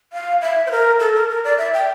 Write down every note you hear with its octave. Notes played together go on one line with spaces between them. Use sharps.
F5
E5
C5
A#4
A4
A#4
A#4
D5
E5
G5